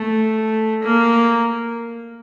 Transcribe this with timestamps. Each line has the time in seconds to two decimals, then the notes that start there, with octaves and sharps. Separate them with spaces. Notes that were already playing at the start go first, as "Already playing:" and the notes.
Already playing: A3
0.83 A#3